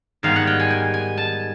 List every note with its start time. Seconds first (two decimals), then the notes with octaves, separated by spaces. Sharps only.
0.23 G#2 D#3 G3 B3 F5
0.36 F#5
0.47 G5
0.59 G#5
0.70 G#5
0.94 G#5
1.17 A5